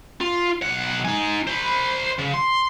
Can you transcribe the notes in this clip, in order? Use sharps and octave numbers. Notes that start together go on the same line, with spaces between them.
F4
B1 F#5
D#4 G#5
C5 B5
C#3
C6